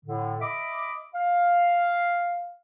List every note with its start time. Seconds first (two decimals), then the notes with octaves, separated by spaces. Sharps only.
0.05 A2 D3
0.40 D#5 E5 B5 D6
1.14 F5